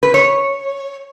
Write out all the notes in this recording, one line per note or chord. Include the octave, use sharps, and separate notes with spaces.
B4
C#5